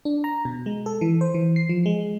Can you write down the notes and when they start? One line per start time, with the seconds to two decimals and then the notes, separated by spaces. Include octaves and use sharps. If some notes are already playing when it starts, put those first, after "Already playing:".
0.05 D4
0.24 A#5
0.45 B2
0.66 G#3
0.86 A4
1.01 E3
1.21 C5
1.34 E3
1.56 C7
1.69 F3
1.86 G#3